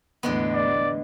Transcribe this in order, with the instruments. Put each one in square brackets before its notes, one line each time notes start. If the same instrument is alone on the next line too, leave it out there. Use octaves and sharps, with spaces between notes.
[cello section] E2 A2 [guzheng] D3 G#3 B3
[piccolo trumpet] D5